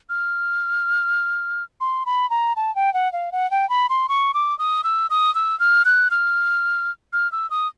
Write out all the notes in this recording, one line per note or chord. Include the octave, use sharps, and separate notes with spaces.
F6
C6
B5
A#5
A5
G5
F#5
F5
F#5
G5
B5
C6
C#6
D6
D#6
E6
D#6
E6
F6
F#6
F6
F6
E6
D#6